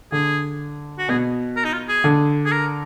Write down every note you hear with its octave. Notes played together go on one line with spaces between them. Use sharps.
D3 G#4
F#4
B2 G#4
A#4
D#4
F4
G#4
D3
G#4
A#4